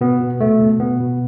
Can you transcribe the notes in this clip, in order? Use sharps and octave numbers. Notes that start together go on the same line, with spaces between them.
B2 B3
B2
B2 A3
B2
B2 B3
B2